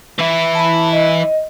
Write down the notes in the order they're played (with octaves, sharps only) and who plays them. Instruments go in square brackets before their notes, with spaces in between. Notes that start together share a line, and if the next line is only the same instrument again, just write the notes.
[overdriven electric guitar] E3 E4
[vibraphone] A5 B5
D#5